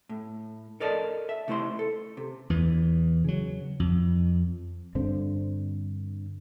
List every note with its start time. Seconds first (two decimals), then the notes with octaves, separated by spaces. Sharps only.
0.09 A2
0.80 A4 A#4 D5 D#5 A5
1.29 E5
1.48 C3 A3 E4 C5 C6
1.79 A4
2.17 C3
2.50 E2 E3
3.24 C#3 F#3
3.80 F2
4.95 G2 D3 C4